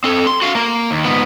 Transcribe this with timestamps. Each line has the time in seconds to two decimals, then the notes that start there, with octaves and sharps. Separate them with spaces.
0.04 C4 A4
0.27 C6
0.42 F#4 F5
0.55 A#3
0.91 D#2
1.04 G#2 B3